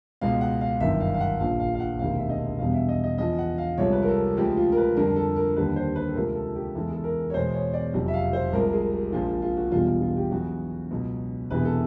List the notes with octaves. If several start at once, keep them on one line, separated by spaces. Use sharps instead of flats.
C#2 B2 G#3 F5
F#5
F5
G1 F#2 D#3 E5
F5
F5
F#5
A#1 A#2 F3 F5
F5
F5
F#5
E1 D2 C3 D#3 F5
E5
D#5
E1 E2 B2 G3 F5
E5
D#5
D#5
E2 C#3 F3 D#5
F#5
F5
C2 C3 F3 G#3 C#5
B4
A#4
A4
D2 C#3 F3 G#3 G4
F4
A#4
B4
F2 D3 G3 A#4
A4
A#4
D#2 D3 G3 B4
C5
B4
A4
C#2 C3 F3 G#3 A#4
A4
G4
E2 C#3 E3 G#3 A4
A4
A#4
C#5
E2 B2 G#3 C5
C#5
D5
F1 F2 C#3 F#3
E5
F5
C5
C2 C3 F3 G#3 A#4
G#4
A#1 A#2 F3 G#3 F4
F4
F#4
E1 E2 B2 G3 F4
F4
F4
G4
E2 C#3 F#3 F#4
C#2 B2 F#3
E1 E2 C3 E3 B4
A4